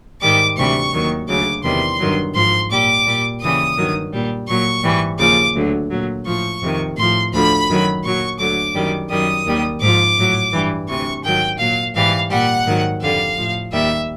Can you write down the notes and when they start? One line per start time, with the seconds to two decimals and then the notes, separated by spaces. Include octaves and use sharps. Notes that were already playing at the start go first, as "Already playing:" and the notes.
0.21 G#2 D#3 G3 D6
0.57 D2 C3 E3 G3 C#6
0.93 D#2 D#3 F#3
1.28 D2 C#3 F#3 D6
1.63 E2 C3 D#3 G3 C6
1.99 G2 D#3 F#3
2.34 G#2 F3 C6
2.70 A#2 G3 D6
3.06 A#2 G3
3.41 D#2 C#3 E3 G3 D#6
3.77 G2 D#3 F#3
4.12 A#2 G3
4.48 A#2 F#3 C#6
4.83 G#2 E3 G3
5.19 D#2 C#3 F3 D6
5.54 D2 D3 F#3
5.90 A#2 F#3
6.26 A2 F3 C#6
6.61 F2 C3 D#3
6.96 A2 F3 C6
7.33 D2 D3 F3 B5
7.68 F#2 D#3 F#3
8.04 A#2 F#3 C#6
8.39 D2 D3 F#3 D6
8.74 F#2 D#3 G3
9.10 F#2 D#3 G3 D#6
9.46 D#2 D#3 G3
9.81 G#2 F3 D6
10.16 A2 F#3
10.52 G2 E3 G3
10.88 D2 C3 E3 C#6
11.23 G#2 D#3 F#3 G5
11.58 A#2 F#3 F5
11.94 G#2 E3 G3 F5
12.30 A#2 G3 F#5
12.66 G#2 D#3 F#3
13.01 F2 D3 G3 F5
13.37 A2 F3
13.72 D#2 D#3 G3 E5